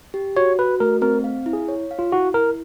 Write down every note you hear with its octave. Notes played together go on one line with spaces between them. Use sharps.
G4
F#4 C#5
F#4 B4
A3 A#4
C4 A#4
F5
E4
G#4
C#5
F5
F4
E4 F#4
E4 A#4